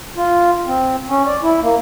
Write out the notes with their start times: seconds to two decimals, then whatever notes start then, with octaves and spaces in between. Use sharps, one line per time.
0.16 F4
0.66 C4
1.09 C#4
1.26 D5
1.43 E4
1.62 A#3